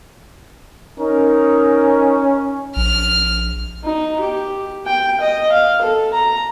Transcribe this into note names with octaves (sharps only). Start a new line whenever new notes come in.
C#4 D#4 A#4
A#1 F6
D#4
G4
G5
D#5
F5
A4
A#5